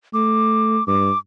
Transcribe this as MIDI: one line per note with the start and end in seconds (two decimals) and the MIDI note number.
0.14 0.79 57
0.14 0.86 86
0.87 1.10 43
0.87 1.18 86